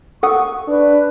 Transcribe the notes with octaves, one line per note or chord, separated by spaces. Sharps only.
A4 F#5 C#6 D#6
D4 B4